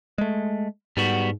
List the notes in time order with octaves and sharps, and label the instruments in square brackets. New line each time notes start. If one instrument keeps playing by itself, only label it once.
[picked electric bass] G#3 A3
[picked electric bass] G#2 [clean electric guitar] G3 B3 F#4